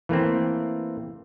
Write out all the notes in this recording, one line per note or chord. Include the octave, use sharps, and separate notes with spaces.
E3 A3 A#3 C4